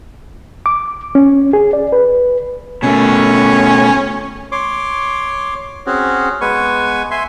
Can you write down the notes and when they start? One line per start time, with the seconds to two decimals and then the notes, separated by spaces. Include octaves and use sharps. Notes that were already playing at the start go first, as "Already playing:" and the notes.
0.66 D6
1.15 C#4
1.53 G#4
1.73 D5
1.93 B4
2.83 B2 A3 C#4
4.52 C#5 C6 D6
5.86 C4 C#4 F#4 G#4
6.41 G#3 B3 B4 G#5 C#6
7.11 E5 G#5 C6